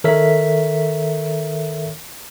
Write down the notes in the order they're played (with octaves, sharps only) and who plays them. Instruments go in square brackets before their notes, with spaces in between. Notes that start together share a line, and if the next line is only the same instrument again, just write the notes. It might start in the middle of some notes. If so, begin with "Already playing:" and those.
[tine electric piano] D#3 A4 A#4 C#5 E5 B6